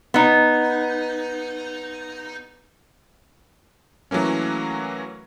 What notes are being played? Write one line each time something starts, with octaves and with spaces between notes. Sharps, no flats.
B3 D#4
E3 F#3 A3 A#3 C#4